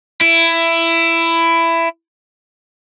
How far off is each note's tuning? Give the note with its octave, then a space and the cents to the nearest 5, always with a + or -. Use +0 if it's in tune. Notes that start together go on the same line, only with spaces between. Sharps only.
E4 +15